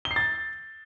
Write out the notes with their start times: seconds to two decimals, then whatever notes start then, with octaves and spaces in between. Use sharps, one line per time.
0.05 G7
0.11 C7
0.16 A6